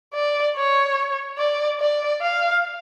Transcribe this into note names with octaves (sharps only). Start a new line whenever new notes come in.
D5
C#5
D5
D5
F5